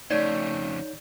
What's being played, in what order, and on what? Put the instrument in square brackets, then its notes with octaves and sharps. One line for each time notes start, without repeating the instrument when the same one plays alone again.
[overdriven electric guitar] F2 C#3 [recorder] A3 [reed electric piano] D#4 C#5 G6 [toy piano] D5